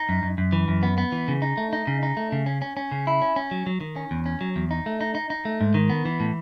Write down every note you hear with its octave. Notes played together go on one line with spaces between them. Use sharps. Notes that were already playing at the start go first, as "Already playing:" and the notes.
Already playing: D#4
F#2
F#2
F#2
E3
F#2
B3
B3
E3
C#3
D#4
A3
D#4
C#3
D#4
A3
C#3
C#4
C#4
C#4
C#3
E4
C#4
C#4
F#3
F#3
D#3
C#4
E2
C#4
F#3
E2
D#4
A3
D#4
D#4
D#4
A3
G#2
D#3
B3
E3
A2